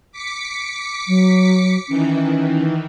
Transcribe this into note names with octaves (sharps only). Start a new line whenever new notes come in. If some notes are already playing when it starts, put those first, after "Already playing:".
D6 B6 C#7
F#3
D#3 E3 C#4